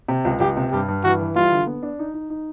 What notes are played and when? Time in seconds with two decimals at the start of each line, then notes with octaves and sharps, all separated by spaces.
0.08 C3
0.25 C#2
0.40 C#2 G4
0.57 C3
0.72 G2 G4
0.88 G2
1.04 E3 F#4
1.19 E3
1.35 G3 F4
1.51 D3
1.67 B3
1.83 D4
1.99 D#4
2.14 D#4
2.30 D#4